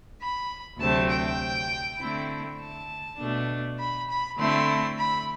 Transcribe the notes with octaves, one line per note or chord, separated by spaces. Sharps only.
B5
D2 C3 F#3 A3 C4 A5
G5
D3 A3 C4 E4
A5
B2 A3 D4
B5
B5
D3 A3 C4 E4 C6
B5